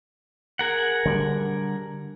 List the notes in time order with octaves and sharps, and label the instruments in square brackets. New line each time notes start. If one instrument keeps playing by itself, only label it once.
[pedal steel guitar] G#4 A#4 F#5
[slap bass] D3 G3